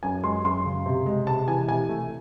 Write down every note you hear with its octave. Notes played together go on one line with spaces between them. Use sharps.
F#2 G#5
G#3 C6
F#2 C6
C#3
C3
G#3
C3 A5
E3 G#5
C3 G#5
A3